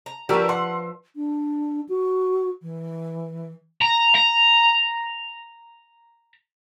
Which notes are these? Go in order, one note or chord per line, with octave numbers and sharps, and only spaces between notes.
A#5
F3 D4 F#4 G4 A#4 B4 E6
F#5 C6
D4
F#4
E3
A#5
A#5